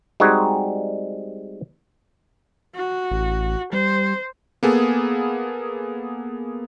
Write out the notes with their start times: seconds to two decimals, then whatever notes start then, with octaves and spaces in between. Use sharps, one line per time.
0.20 G3 G#3 C4 D#4 F#4 G#4
2.75 F#4
3.11 A1
3.73 G3 C5
4.63 A#3 B3 G#4 A4